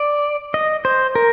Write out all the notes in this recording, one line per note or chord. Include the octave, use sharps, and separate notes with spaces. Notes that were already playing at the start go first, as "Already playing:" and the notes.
Already playing: D5
D#5
C5
A#4